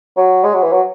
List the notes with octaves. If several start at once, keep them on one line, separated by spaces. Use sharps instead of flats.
F#3
G#3
F#3
E3
F#3